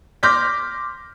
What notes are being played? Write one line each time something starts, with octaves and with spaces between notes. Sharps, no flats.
C6 D6 F6 G6 A#6 B6